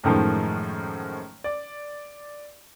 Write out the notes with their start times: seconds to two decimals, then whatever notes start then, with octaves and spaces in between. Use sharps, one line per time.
0.04 F#2 A2 D#3 F3 G#3
1.44 D5